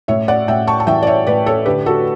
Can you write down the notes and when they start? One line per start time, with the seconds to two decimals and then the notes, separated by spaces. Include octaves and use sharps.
0.08 A2 C#5 E5
0.28 D5 F#5
0.48 A2 E5 G5
0.67 A5 C#6
0.80 A5
0.87 E3 E5 G5
1.03 D5
1.07 C#5 E5
1.27 A2 B4 D5
1.46 A4 C#5
1.66 D3 G4 B4
1.86 F#4 A4